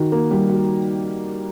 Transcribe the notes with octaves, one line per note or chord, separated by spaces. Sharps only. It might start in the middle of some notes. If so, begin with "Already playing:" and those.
Already playing: D#3 F#4
A#3
G3
F#4